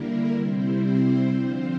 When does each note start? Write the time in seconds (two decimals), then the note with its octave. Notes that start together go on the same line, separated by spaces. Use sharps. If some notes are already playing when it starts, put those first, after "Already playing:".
Already playing: D3 G3 A#3 E4 A#4
0.30 C3 G3 C4 E4 C5
0.80 C5
1.30 D3 F3 C4 F4